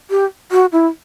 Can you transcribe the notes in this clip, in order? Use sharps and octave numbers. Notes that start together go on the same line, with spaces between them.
G4
F#4
E4